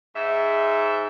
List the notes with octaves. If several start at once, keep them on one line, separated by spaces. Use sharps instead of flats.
G#2 E5